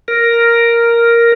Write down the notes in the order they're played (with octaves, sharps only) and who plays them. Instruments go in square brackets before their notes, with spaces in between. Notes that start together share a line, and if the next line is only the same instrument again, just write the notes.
[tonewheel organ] A#4